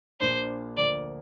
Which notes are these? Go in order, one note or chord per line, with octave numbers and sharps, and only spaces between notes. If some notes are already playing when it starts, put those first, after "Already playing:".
A#1 A#2 F3 A#3 D4 C5
D2 D3 F3 A#3 D5